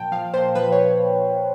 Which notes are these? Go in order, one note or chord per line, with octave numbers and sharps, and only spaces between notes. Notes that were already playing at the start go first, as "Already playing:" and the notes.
Already playing: A#2 F3 G5 A5
F3 F5
A#2 C5
F3 B4
C#5